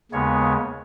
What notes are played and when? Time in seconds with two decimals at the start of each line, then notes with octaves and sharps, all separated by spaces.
0.12 D#2 C#3 G#3 B3 C#5